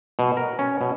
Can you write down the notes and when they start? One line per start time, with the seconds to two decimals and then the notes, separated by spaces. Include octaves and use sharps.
0.19 B2
0.37 A#4
0.59 C#4
0.81 B2